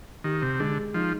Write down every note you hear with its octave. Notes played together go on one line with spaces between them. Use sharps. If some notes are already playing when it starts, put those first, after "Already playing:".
D#3 G4
C3
D3 G#3
F3 D#4